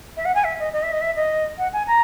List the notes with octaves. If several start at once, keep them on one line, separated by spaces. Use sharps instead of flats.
E5
F#5
G#5
E5
D#5
D#5
E5
D#5
E5
D#5
F#5
G#5
A#5